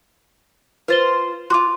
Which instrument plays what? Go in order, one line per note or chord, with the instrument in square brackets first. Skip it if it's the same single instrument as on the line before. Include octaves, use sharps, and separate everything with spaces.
[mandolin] F4 C5 [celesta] B4 A6 G7
[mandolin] F4 F#4 [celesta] C6 D6